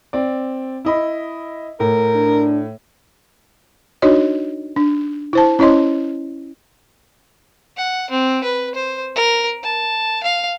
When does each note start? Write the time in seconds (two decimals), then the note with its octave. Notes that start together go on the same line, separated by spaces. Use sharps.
0.13 C4 D5
0.85 E4 D#5 B5
1.80 A2 A#4
2.15 D4
4.02 D4 D#4 F#4 C#5 D#5
4.76 D4
5.33 E4 C5 A5
5.59 C#4 E4 C#5 D#5 C6
7.77 F#5
8.10 C4
8.44 B4
8.75 C5
9.15 A#4
9.63 A5
10.23 F5